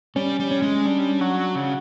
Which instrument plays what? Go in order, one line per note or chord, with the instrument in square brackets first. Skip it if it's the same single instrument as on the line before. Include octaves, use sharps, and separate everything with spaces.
[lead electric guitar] G3 [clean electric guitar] C#4
[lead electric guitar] G3
[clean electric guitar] C#4
[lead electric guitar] G#3
[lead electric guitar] G3 [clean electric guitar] D4
[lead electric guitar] F#3 [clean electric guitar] F#4
[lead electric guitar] C#3